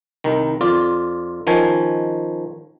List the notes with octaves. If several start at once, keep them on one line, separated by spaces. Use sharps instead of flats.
C2 D#3
F2 F4 D5
D#3 F3 C#4 G#5